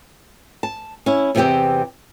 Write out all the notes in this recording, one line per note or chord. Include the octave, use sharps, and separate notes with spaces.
A5
C#4 E4
E2 C3 E3 D#4 G4 C5